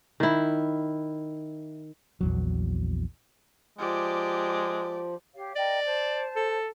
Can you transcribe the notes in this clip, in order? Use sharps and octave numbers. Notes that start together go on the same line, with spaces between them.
D#3 E4
A#1 E2 F#3
F3 G#3 G4 D5
G4 C#5 F5
A#4 D5 D#5 G5
C5 A5
A4